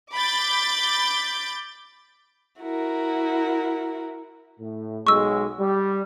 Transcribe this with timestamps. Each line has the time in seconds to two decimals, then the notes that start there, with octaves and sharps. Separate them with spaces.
0.13 B5 D6 G6 A6
2.60 E4 F#4 A#4
4.60 A2
5.07 B1 G#3 C#6 E6
5.60 G3